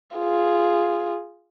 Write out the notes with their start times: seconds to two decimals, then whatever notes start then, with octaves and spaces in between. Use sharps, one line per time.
0.17 F4 G#4